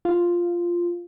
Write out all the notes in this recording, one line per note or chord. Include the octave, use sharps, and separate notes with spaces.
F4